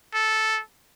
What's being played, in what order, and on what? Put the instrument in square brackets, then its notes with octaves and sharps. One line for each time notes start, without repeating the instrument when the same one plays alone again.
[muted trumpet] A4